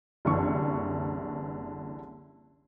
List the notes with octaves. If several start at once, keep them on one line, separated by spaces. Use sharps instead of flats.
F#1 C2 D3 E3 C#6